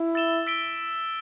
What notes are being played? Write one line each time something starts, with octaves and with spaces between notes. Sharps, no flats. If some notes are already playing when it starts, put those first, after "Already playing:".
Already playing: E4
E6 A6 E7 G7
E6 B6 D7 G7